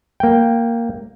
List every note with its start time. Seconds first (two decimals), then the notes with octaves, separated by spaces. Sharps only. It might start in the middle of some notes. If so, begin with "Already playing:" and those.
0.20 A#3 G5